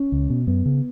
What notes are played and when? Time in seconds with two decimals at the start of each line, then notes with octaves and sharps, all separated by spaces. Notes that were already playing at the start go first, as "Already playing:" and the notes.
Already playing: C#4
0.12 C#2
0.30 B2
0.47 F#2 B3
0.66 C#3